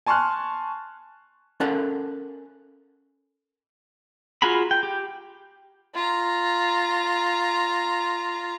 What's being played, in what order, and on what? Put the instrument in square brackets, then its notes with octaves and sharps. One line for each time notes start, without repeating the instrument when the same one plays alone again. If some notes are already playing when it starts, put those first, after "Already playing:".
[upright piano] G#5 A5 C6 C#6 F6 F#6
[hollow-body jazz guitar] C#4 A4 A#4 F#5 A5
[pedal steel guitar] F4 F#4 G#4 A#5 B5
G5
G4
[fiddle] F4 A#5